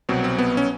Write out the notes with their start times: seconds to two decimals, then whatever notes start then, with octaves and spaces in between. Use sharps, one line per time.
0.09 C2 B2 F#3 C4
0.24 C4
0.38 B3
0.57 C#4